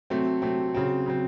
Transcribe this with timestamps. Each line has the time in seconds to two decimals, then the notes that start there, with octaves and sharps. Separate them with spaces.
0.10 C3 F#3 A3 C4
0.42 C3 F#3 A3 C4
0.74 C#3 F#3 C4
1.06 C#3 F#3 C4